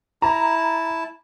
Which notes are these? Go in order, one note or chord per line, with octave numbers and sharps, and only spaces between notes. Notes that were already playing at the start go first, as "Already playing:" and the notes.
E4 A5 A#5